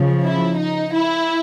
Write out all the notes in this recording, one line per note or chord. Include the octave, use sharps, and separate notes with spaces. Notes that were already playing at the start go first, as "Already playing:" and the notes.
Already playing: C#3 F3
E4
D#4
E4